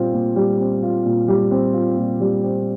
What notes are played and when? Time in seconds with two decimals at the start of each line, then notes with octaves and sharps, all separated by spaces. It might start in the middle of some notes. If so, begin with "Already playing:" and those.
Already playing: A#2 G3 C4 F4
0.14 A#2
0.36 G3
0.60 C4
0.83 F4
1.06 A#2
1.28 G3
1.51 C4
1.74 F4
1.97 A#2
2.20 G3
2.43 C4